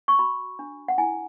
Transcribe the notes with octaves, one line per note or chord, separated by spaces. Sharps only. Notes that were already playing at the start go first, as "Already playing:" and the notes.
C#6
F#4 B5
D4
F#5
E4 G#5